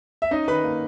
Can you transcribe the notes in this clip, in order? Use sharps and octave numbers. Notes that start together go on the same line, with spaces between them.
E5
C#4 D#4 D#5
D#3 B4 B5
A#3